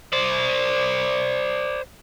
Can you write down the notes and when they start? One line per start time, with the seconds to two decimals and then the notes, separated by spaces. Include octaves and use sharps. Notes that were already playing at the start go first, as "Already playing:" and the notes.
0.13 C5 D5